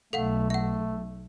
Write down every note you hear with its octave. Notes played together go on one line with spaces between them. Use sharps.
B1 A3 A4 F5 F#5
A3 E5 F#5